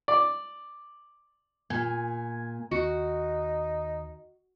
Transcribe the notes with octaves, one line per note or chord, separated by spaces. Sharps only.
D5
A#2 G#5
D#2 D#4 F#4